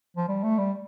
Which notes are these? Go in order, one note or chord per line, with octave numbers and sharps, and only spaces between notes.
F3
G3
A3
G3